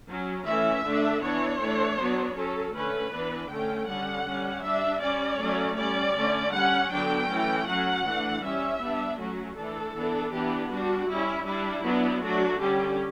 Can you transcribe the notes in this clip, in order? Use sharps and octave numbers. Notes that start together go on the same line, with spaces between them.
F#3 C#4
E3 A3 C#4 E5
D3 A3 D4
E3 B3 D4 C#5
E3 A3 D4
F#3 B3 D4
F#3 C#4 A4
D3 A3 C#4 B4
E3 B3 D4
D3 A3 C#4 G5
D3 G3 C#4 F#5
G3 C#4
G3 D4 E5
G3 C#4 D5
F#3 A3 C#4
G3 C#4 D5
D3 A3 C#4
G3 C#4 F#5
D3 F#3 B3 D4 G5
E3 A3 C#4
F#3 C#4 F#5
E3 A3 D4
G3 C#4 E5
G3 B3 D4
F#3 A3 C#4 F#4
E3 A3 D4 A4
E3 B3 D4
E3 B3 D4 G4
G3 D4 F#4
G3 C#4 E4
G3 D4 E4
F#3 B3 D4
F#3 A3 D4 F#4
D3 G3 C#4 G4